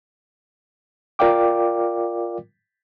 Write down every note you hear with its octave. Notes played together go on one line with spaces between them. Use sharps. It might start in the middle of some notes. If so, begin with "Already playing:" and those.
F4 A#4 D5 F5 G5 D6